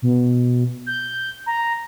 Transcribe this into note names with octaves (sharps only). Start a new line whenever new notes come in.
B2
G6
A#5